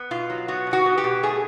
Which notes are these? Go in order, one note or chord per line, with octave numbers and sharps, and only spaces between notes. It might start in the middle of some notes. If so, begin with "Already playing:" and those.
Already playing: B3
B2 F4
F#3
B3 F#4
B2
F#4
B3
G4
B2
A3 G#4